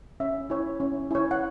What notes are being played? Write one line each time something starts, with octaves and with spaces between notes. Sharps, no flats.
C#4 E5
E4 C#5
C#4
E4 C#5
F#5